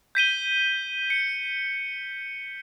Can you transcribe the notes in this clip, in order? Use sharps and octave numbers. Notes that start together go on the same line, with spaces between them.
G6 B6 D#7 G7
C#7